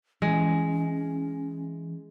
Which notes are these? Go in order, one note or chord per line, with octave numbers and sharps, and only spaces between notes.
E3 G#3 C#4